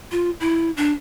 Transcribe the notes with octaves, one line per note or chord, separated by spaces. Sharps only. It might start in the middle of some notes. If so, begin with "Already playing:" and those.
F4
E4
D4